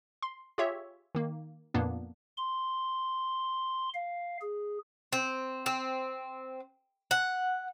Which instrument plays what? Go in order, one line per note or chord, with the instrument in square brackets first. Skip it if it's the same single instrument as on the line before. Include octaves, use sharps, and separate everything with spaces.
[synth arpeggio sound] C6
F4 G4 G#4 C#5 E5
D#3 A#3
F2 A#2 A#3 B3 D4
[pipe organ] C6
F5
G#4
[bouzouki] C4
C4
F#5